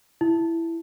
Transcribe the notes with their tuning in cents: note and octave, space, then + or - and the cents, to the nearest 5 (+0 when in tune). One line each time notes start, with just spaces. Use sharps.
E4 +10